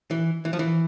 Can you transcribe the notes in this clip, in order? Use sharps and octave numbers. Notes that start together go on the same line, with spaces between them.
E3
E3
F3
E3